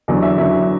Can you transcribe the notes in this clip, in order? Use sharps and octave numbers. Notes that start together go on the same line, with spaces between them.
E2 D3 F#3
E5
E2 D3 F#3 E5